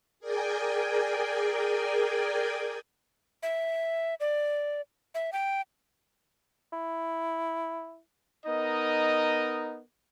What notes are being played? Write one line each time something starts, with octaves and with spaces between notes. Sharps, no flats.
G#4 A#4 D5 G5 G#5
E5
D5
E5
G5
E4
B3 D#4 A#4 D#5